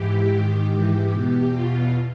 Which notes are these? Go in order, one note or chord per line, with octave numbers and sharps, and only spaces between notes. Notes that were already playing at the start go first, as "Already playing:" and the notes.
Already playing: G#2 E3 G4
G#2 D#3
G#2 E3 G4
E2 B2
E2 B2 F4